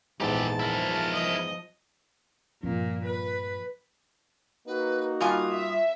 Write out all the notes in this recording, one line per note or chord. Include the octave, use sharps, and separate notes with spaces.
A#1 E2 G#2 G4 A4 A5
F3 E4 A#4
D#5
G2 A#2 F3 A#3
B4
A#3 D#4 F#4 B4
G2 F4 G#5 D#6
E5